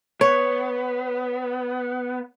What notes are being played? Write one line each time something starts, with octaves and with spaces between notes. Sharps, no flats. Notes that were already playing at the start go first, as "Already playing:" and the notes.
B3 C#5